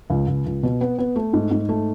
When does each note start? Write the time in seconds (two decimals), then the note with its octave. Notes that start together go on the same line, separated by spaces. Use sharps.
0.10 C#2
0.28 C#2
0.46 C#2
0.63 B2
0.81 B3
0.99 B3
1.16 A3
1.33 G#2
1.51 G#2
1.69 A3